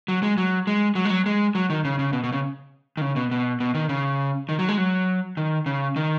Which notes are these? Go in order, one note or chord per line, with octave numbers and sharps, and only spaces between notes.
F#3
G#3
F#3
G#3
F#3
G#3
F#3
G#3
F#3
D#3
C#3
C#3
B2
B2
C#3
D#3
C#3
B2
B2
B2
D#3
C#3
D#3
F#3
G#3
F#3
D#3
C#3
D#3